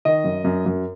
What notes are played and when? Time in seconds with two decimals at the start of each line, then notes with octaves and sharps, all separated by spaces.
0.05 D#3 D#5
0.24 F#2
0.44 F#2
0.66 F#2